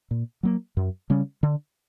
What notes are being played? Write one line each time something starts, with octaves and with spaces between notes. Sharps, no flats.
A#2
F#3 A#3
F#2
C#3 G3 C#4
D3